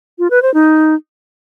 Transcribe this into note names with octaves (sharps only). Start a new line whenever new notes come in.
F4
B4
C5
D#4